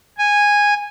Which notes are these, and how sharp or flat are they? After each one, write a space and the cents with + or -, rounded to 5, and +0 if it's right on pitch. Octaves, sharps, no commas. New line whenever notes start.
G#5 -10